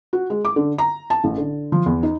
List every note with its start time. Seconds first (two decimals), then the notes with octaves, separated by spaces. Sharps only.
0.13 F#4
0.30 G#3
0.45 D6
0.56 D3
0.78 A#5
1.10 A5
1.24 A1
1.38 D3
1.72 F3
1.86 E2
2.03 D#4